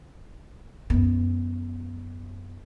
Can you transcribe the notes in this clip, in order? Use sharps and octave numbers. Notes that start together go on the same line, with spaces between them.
F#2 B3